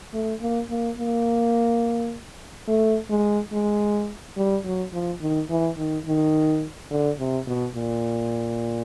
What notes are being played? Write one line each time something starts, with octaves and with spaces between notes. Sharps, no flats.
A3
A#3
A#3
A#3
A3
G#3
G#3
G3
F#3
F3
D#3
E3
D#3
D#3
D3
C3
B2
A#2